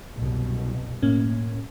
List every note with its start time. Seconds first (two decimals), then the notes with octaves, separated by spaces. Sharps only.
0.15 C2 F#2 B2
1.02 A2 A#3 C#4